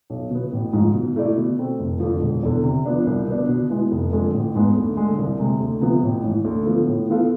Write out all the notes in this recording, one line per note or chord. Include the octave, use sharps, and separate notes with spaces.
B1
B2 B3
A1
G#2 F3 G#3
B2
A3 E4 A4 D5
B2
A3 C4
F1
F2 D3 F3
E1
E2 D3
C3
F3 B3 D4
C2
B2 B3 D4
B2
G#3 B3 E4
F1
F2 D3 G#3
A1
G#2 G#3 B3
D2
D3 G#3
C2
C3 G#3
D2
C3 F3 B3
A1
G#2 E3
D2
D3 F3 B3
A2
E3 B3 F4 A4